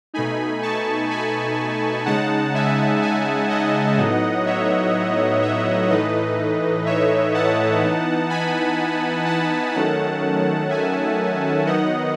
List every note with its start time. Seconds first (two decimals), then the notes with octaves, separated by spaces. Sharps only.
0.14 B2 A3 D#4 G#5 B5
0.62 A5 C#6
1.10 G#5 B5
2.06 C#3 G#3 D#4 F#5 A5
2.55 E5 G#5
3.02 E5 G#5
3.50 D#5 F#5
3.98 A2 F#3 B3 D#4
4.46 C#5 E5
5.42 C#5 E5
5.90 A2 E3 A3 D#4 B4 D#5
6.86 C#5 E5
7.34 F#5 A5
7.82 E3 B3 D#4
8.30 G#5 B5
9.26 F#5 A5
9.74 D#3 F#3 A3 C#4 F#5 A5
10.70 E5 G#5
11.66 D#3 F#3 B3 D#4 D#5 F#5